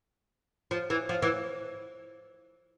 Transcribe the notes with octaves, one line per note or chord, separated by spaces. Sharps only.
F3
E3
F3
E3